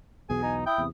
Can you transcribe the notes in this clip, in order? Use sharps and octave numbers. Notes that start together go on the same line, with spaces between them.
B1 E2 B2 G#4 G#5
D#4
E4 G5 D#6
E2 C3